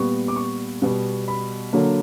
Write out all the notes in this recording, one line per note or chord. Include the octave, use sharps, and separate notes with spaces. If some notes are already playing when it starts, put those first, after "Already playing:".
Already playing: A#2 G3 B3 C#6
D6
C#6
B2 G3 B3
B5
D3 F#3 A#3